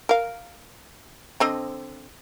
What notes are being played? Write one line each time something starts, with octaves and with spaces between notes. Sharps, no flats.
A#4 F5
D3 C4 D#5